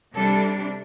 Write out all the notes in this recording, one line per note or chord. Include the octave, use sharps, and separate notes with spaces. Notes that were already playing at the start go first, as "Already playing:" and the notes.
C3 G3 D4 A4